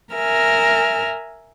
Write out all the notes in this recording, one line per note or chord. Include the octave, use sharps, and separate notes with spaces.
A#4 E5 G#5 F6